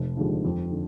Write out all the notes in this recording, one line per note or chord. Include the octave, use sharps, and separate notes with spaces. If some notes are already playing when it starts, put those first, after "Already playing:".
Already playing: F1
D#2 D3 F3 G#3
F2
D3